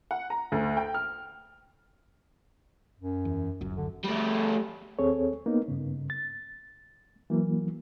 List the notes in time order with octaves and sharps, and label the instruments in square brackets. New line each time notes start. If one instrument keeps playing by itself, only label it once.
[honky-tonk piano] F#5
A#5
D2
G5
F6
[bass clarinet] F#2
[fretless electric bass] E2
D1 G1 F#2
[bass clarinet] D3
[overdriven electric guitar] G3 A3
[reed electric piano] D#2 C4 G#4 A4 C#5
A#3 B3 D#4
G2 C#3
A6
E3 F#3 A#3